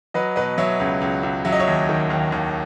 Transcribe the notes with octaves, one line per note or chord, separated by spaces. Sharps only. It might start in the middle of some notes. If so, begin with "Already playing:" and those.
F#3 B4 D#5
B2 B4 D#5
F#3 C#5 E5
C#2
C#2
C#2
F#3 E5
D#5
C#5 E5
D#2
D#3
D#2
D#2